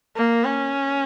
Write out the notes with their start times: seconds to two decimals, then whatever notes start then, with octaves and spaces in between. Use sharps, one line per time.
0.16 A#3
0.45 C#4